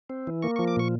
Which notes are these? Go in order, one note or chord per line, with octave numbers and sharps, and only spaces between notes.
C4
E3
A#3 C#6
F3 C#6
D6
A#2 C#6